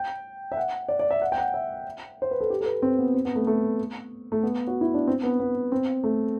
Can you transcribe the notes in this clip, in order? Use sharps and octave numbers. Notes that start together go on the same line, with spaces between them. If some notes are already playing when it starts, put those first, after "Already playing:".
Already playing: G5
E5
F#5
D5
D5
E5
F#5
G5
F#5
E5
C5
B4
A4
G4
A4
B4
C4
B3
C4
B3
A3
A3
A3
B3
F#4
E4
D4
C4
B3
B3
C4
A3